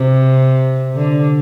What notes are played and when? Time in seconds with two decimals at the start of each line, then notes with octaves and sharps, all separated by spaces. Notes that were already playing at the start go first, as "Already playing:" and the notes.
Already playing: C3
0.96 D3